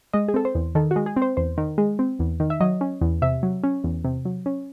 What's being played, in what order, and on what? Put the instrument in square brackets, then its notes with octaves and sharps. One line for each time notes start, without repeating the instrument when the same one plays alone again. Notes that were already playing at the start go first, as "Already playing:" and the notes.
[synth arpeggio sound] G#3 D#5
G#4
C4 A4
C5
E2
D#3 A4
F#4
G#3
G#4
C4
C5
E2 C5
D#3
G#3
C4
E2
D#3
E5
F#3 D#5
C#4
E2
C3 E5
F#3
C#4
E2
C3
F#3
C#4